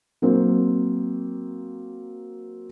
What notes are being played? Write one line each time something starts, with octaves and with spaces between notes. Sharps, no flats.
F#3 A#3 C4